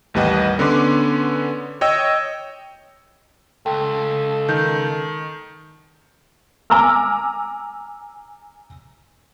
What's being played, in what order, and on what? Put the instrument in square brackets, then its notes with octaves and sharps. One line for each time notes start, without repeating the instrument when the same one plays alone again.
[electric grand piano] A1 D#2 G3 B4 D#5 F#5
D3 B3 C#4 B4 C6 D6
C#5 D#5 G5 E6
[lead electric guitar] C#2 [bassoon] A4 [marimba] G5
[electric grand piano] D#3 [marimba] G6
[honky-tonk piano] G#5 A#5 D6 E6 F6